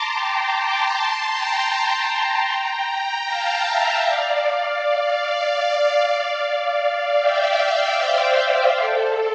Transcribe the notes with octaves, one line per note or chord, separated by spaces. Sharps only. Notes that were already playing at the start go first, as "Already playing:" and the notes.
Already playing: A5 A#5 C6 D6
G5 A#5
A5 C6
G5 A#5
F5 A5
E5 G5
D5 F5
E5 G5
D5 F5
C5 E5
A4